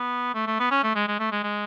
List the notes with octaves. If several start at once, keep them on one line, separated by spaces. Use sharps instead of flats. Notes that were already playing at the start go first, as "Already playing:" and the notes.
Already playing: B3
A3
A3
B3
C#4
A3
G#3
G#3
A3
G#3
G#3